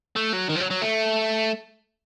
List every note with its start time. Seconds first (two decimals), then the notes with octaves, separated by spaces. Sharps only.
0.16 A3
0.33 F#3
0.49 D#3
0.56 F3
0.60 F#3
0.71 F#3
0.82 A3